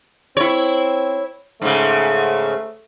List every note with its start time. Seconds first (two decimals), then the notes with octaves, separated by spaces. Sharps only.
0.37 C4 E4 C#5
1.62 G#2 C#3 A3